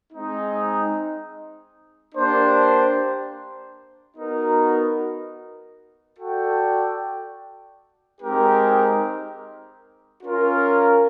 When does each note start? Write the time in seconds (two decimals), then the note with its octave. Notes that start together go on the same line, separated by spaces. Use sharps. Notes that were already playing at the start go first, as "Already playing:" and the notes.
0.12 G#3 C4 D#4
2.14 A#3 D4 G4 C5
4.16 B3 D#4 F#4 A#4
6.19 F#4 A4 D5 G5
8.20 G#3 C4 D#4 G4 A#4
10.22 C#4 F4 A#4